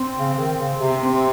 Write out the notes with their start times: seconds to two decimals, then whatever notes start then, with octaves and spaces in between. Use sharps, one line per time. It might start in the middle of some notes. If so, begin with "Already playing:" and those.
Already playing: C4
0.19 C#3
0.34 C#3
0.38 D#3
0.58 C#3
0.78 C3
0.98 C4